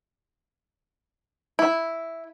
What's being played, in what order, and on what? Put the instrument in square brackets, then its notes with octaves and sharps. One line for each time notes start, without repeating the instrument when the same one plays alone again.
[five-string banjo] E4